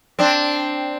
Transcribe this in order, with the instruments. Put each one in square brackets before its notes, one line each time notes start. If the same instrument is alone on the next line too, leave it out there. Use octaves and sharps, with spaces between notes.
[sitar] C4 D4